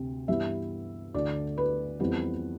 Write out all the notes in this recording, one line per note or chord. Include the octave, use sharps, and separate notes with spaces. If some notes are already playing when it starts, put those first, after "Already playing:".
Already playing: D2 C3 C4
G2 E3 G3 B3 E5
D2 D3 A3 D5
B4
F2 E3 G3 B3